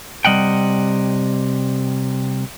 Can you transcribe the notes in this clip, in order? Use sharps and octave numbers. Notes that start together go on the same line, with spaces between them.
C3 G3 D#5 F#5 G5